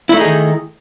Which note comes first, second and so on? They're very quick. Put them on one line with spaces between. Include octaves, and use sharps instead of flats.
E4 A3 D#4 G#4 D#3